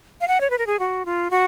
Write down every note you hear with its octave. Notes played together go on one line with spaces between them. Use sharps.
F5
F#5
C#5
B4
A#4
G#4
F#4
F4
F#4